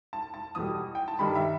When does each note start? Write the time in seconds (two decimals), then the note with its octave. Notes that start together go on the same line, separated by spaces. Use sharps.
0.13 A5
0.34 A5
0.55 E2 B2 G3 D#6
0.95 G5
1.08 A5
1.19 G2 D#3 G3 B5
1.35 E5